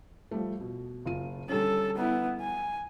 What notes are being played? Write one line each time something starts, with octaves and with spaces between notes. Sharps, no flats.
F3 G3 A3
B2
F#1 F4 D#7
D3 G3 C#4 A4
B3 E4
G#5